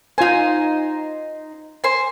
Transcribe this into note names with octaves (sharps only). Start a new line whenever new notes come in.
D#4 F4 C5 G#5
C5 G#5